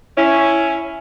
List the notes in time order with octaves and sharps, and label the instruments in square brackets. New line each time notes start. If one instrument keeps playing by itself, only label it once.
[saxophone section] C#4 E4